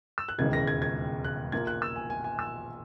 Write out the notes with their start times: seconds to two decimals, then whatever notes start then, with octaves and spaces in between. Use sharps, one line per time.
0.18 E6
0.29 F#6
0.38 E1 D#2 C#3 E3 G#3 G#6
0.53 A#6
0.67 G#6
0.82 G#6
1.24 F#6
1.52 A#1 A#2 A#3 G#6
1.67 F#6
1.82 E6
1.96 G#5
2.10 G#5
2.24 G#5
2.39 E6